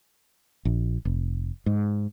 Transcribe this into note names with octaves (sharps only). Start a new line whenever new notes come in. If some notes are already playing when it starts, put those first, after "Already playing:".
A#1
F1
G#2